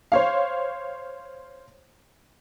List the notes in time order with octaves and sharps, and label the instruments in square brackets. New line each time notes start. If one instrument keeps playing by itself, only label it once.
[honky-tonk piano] C5 C#5 F5